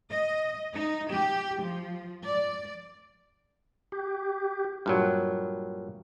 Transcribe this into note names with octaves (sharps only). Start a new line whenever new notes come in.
D#5
D#4
G4
F3
D5
G4
G2 A#2 F#3